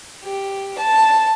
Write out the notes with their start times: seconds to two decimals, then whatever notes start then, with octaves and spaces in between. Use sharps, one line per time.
0.23 G4
0.78 A5